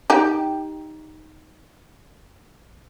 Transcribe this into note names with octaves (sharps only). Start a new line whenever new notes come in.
D#4 G4 G5